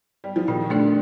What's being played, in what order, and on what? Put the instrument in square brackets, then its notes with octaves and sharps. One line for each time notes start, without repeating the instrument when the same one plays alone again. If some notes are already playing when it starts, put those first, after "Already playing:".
[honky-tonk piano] G3
F3
[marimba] A#2 [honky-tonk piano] D#3
[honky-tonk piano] D3 [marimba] A3 D4 G4 D5